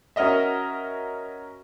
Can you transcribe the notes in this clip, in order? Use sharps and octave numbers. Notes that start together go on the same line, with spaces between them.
C#4 F#4 A#4 D#5 E5